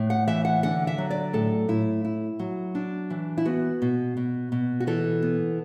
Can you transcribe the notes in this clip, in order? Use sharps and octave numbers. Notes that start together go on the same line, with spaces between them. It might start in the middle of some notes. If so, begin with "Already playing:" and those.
Already playing: A2
F#5
E3 E5
F#5
D3 F#5
E5
F#3
D5
A2 A4
A2 E4
E4
F#3
D4
E3
E4
B3 F#4
B2
B2
B2
F#4
E3 A4
B3